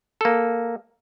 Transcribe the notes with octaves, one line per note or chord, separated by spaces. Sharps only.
A#3 A4